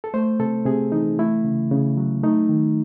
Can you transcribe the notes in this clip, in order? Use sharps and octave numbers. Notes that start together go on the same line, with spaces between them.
A4
A3 C5
C3 A4
C3 G#4
E3 D#4
A3 E4
C#3
C#3
F#3
A3 D#4
D#3